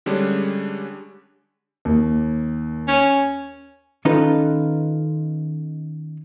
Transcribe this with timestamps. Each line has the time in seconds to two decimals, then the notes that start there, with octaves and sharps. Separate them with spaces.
0.06 D3 G3 G#3 C#4 D4
1.85 D#2
2.88 C#4
4.05 D#3 C#4 D#4 F4 A4 B4